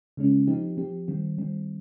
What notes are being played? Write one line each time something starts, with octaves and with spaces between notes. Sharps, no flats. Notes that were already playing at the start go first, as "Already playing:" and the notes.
C#3 G#3 C#4
F3 C4 D#4 G4
F3 C4 G4
D#3 G3 C4
D#3 G3 C4